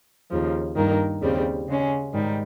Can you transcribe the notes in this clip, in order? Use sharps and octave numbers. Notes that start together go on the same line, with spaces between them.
D#2 C#3 F3
G2 D#3 A#3
D#2 C#3 G3 C4
C#3 G#3 C#4
G#2 D#3 G3